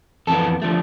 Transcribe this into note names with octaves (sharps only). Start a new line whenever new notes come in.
F2 E3 B3 A4
D3 F3 A3